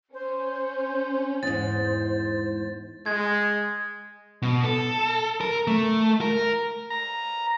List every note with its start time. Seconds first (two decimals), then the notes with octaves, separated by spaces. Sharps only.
0.14 C#4 C5
1.43 E2 G#2 C5 A6
3.06 G#3 G#6
4.42 B2
4.64 A4
5.41 A#4
5.67 A3
6.21 A#4
6.90 A#5